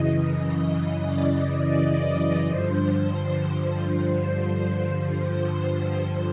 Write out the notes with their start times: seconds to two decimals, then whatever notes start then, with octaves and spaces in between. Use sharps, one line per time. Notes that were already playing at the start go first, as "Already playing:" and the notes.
Already playing: F#2 C#3 E3 D#5
1.05 D5
2.48 G2 D3 F3 C5